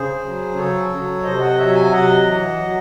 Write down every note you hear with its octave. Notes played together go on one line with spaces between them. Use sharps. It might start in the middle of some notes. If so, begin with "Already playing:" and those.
Already playing: C#3 G#4 C5
F#3
C#3 A4 C#5
F#3
C3 C5 D#5
D#5 F#5
F#3 C#5 E5
E5 G#5
C3 D#5 F#5
E3
F#3